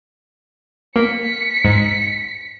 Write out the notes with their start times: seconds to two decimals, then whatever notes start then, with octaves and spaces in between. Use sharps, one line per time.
0.96 A#3 B6 C#7
1.65 G#2